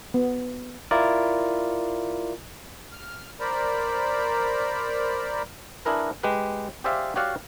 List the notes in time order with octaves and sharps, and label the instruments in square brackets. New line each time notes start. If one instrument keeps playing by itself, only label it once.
[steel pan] B3
[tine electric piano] E4 F4 A#4 D5
[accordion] F6
A#4 C5 D5 A#5 B5
[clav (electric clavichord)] D4 E4 G#4 A#4 B4
G#3 G4 B4
G4 G#4 C5 D5 E5 F5
F#4 G4 C#5 D5 F5 F#5